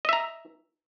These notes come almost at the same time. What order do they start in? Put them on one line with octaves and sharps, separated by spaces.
D#5 E5 A#5